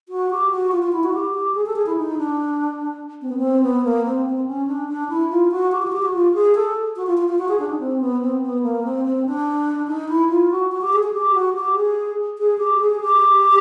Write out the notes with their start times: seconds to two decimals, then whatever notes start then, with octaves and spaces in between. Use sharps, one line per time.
0.09 F#4
0.31 G4
0.51 F#4
0.72 F4
0.82 F4
0.92 E4
1.04 F#4
1.14 G4
1.34 G4
1.55 G#4
1.66 A4
1.76 G#4
1.86 E4
1.97 D#4
2.18 D4
3.22 C4
3.29 B3
3.38 C4
3.63 B3
3.85 A#3
4.05 C4
4.26 C4
4.47 C#4
4.67 D4
4.89 D4
5.09 E4
5.30 F4
5.51 F#4
5.72 G4
5.82 F4
5.87 F#4
5.92 G4
6.02 F#4
6.14 F4
6.34 G#4
6.55 A4
6.96 F#4
7.07 F4
7.18 F4
7.28 F4
7.39 F#4
7.49 G#4
7.59 D4
7.69 D#4
7.80 C4
8.01 B3
8.22 C4
8.42 B3
8.63 A#3
8.84 C4
9.05 C4
9.26 D4
9.88 D#4
10.09 E4
10.29 F4
10.51 F#4
10.72 F#4
10.81 G4
10.93 G#4
11.03 G#4
11.13 G4
11.34 F#4
11.55 G4
11.75 G#4
12.39 G#4
12.58 G4
12.79 G#4
13.01 G4